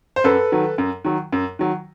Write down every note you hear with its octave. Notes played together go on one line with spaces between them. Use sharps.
C5
F#2 A4 B4
D#3 F#3
F#2
D#3 F#3
F#2
D#3 F#3